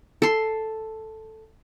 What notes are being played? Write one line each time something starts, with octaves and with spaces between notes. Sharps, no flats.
A4 C6